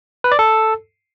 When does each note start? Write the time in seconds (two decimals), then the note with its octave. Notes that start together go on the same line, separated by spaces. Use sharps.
0.24 B4
0.32 D5
0.39 A4